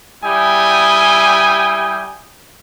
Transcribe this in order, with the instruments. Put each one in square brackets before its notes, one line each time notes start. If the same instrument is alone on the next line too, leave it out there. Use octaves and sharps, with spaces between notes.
[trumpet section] G3 E4 G5 G#5 D#6